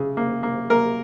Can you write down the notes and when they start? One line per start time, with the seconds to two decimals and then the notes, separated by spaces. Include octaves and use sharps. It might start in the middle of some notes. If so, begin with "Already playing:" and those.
Already playing: C#3
0.17 A#3
0.43 A#3
0.70 A#3 A#4